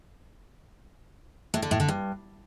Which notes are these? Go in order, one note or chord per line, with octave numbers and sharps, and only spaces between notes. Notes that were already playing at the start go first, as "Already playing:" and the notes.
A2
D3
A2
D3
G2